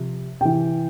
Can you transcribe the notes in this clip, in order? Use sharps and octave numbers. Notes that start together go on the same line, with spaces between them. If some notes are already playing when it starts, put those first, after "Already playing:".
Already playing: C3 F3
C3 E3 G5